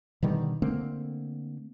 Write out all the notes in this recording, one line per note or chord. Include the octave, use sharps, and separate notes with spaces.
B2 D3 D#3 G3
D3 A3 A#3 C4